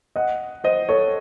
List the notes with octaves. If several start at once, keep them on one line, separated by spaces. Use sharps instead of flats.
D#5 F#5
C5 D#5
A4 C#5